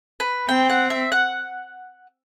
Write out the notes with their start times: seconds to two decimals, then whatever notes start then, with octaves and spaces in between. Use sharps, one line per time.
0.20 B4
0.48 C4 G5
0.70 F#5
0.90 E5
1.12 F#5